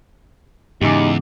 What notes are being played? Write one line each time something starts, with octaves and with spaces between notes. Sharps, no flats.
E2 G#2 C#3 D#4 G4 G#5 D6